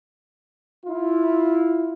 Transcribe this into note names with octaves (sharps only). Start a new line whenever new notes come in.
E4 F4